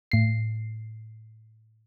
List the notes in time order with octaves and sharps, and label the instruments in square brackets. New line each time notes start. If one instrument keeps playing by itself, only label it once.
[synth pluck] A2 C7